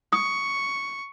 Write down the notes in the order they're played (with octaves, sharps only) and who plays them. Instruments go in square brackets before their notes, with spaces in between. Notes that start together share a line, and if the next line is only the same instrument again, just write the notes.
[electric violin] C#6 [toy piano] D#6